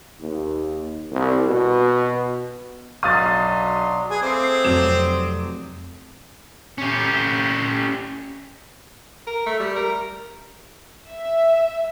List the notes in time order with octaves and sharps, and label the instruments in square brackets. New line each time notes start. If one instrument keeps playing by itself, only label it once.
[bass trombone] D#2
C2
B2
[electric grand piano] B1 F5 D#7 [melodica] F#3 D4 C6 [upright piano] D#6 A6
[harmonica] G#4 [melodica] B4 G#5
[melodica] A3 G#4 F5 [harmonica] C4 C5 [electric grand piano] D6 C7
[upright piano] F1 E7 [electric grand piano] F#3 [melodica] D6 D#6
[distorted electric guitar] C#4 G4
[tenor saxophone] A#4
A3
G3
A#4
[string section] E5